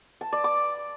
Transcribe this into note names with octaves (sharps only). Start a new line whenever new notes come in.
A5
D5
D6